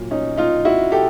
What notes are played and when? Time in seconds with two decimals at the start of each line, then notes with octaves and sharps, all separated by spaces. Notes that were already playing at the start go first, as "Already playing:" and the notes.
Already playing: A#2 F#3
0.11 C#4 D#4
0.38 D#4 F4
0.65 E4 F#4
0.92 G4 A4